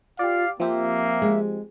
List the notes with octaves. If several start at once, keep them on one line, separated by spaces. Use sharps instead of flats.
F4 G4 D5 F5
F3 A#3 C4 G4 E5
G#3